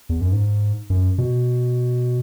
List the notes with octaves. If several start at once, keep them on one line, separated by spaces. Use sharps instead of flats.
E2
F#2
G#2
F#2
B2